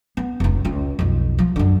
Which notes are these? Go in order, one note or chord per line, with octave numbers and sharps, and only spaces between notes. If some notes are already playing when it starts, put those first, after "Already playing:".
B3
F1 C#2
C#2 F4
B1 F2
F3
F#2 D3